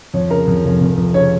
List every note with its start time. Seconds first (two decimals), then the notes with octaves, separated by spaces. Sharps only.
0.14 F2 C#5
0.30 C#3 A#4
0.47 F2
0.64 F1
0.81 F1
0.97 F2
1.14 C#3 C#5